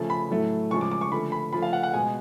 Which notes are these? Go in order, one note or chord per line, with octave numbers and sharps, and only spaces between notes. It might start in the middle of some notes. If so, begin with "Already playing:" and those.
Already playing: C#3 F3 A3
B5
A2 F#3 A3
C#3 F3 G#3 C#6
D6
D6
C#6
D3 F3 A3 B5
B5
C#3 F3 A3 B5
F5
F#5
F#5
B2 G#3 G#5